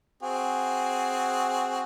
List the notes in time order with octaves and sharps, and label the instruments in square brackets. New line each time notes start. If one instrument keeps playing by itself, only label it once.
[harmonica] C4 F#4 G#4